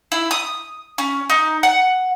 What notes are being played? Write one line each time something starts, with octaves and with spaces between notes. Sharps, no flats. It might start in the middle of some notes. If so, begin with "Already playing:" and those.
E4
D#6
C#4
D#4
F#5